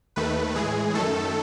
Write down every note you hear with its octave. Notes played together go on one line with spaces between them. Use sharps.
D#2 D#3 A3 B4
A2 E3 G#3 G#4
F#2 D#3 A3 A4